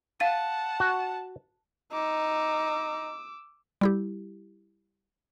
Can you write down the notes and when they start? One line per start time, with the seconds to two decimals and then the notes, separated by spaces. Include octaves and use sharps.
0.20 F5 F#5 A5 A6 D#7
0.80 F#4
1.93 D#4 D6 E6
3.81 G3 E4 G4